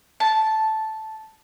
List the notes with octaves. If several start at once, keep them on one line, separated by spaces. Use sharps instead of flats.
A5